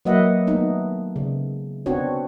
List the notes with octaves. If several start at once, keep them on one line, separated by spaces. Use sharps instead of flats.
F#3 A#3 B4 D#5 E5 F#5
A3 B3 D#4
C#3
B3 C4 D4 F#4 C#5